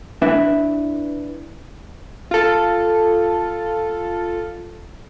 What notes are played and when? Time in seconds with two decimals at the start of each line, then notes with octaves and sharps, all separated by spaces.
0.22 D4 E4 B4 E5
2.31 F4 A4